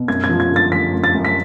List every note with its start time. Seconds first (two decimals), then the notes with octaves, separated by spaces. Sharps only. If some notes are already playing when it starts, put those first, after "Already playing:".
Already playing: B2
0.08 F#2 G#6
0.24 G#6
0.29 F3
0.40 G#6
0.51 D3
0.56 A6
0.71 F3 B6
0.93 F#2
1.04 A6
1.15 F#2
1.25 B6